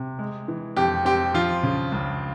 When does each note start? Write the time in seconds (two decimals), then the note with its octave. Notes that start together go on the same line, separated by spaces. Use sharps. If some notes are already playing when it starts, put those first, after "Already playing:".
Already playing: C3
0.19 G#3
0.48 E3
0.77 F2 G4
1.05 C4 G4
1.34 F3 F4
1.63 C#3
1.92 C#2